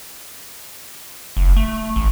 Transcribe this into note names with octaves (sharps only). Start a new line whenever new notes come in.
F#1
A3
A1